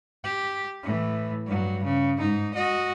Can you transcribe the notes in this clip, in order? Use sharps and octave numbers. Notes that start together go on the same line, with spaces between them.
G4
A2 E3
G2 F#3
C#3
G#2 D#4
F#4 D#5